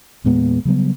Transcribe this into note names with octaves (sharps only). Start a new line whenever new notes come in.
E2 A#2 G#3 B3
C#3 F#3 G3 B3